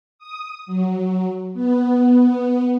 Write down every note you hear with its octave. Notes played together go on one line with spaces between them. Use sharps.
D#6
F#3
B3